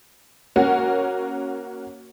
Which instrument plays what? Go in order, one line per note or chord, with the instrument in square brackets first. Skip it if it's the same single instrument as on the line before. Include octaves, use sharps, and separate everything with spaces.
[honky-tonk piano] A#3 C#4 F#4 A#4